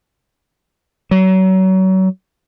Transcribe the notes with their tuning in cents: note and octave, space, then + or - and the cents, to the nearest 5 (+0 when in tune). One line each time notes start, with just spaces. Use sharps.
F#3 +30